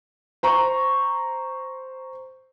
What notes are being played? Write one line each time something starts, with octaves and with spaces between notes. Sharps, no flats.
C5 A#5 C#6